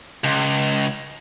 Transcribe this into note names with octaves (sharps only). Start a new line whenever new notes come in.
C#2